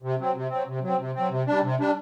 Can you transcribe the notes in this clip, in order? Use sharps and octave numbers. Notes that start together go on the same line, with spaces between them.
C3
F#3 C4
C3
F#3 C4
C3
F#3 C4
C3
F#3 C4
C3
G3 D4
C3
G3 D4